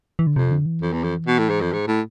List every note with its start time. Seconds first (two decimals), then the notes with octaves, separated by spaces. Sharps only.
0.19 E3
0.27 D3
0.36 F2 C3
0.51 D3
0.66 E3
0.82 F2
0.93 E2
1.04 F2
1.27 B2
1.39 A2
1.50 G#2
1.61 F2
1.73 G#2
1.88 A2